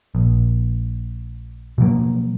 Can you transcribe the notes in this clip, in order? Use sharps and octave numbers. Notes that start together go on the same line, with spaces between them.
A#1
B2 F3 F#3 A#3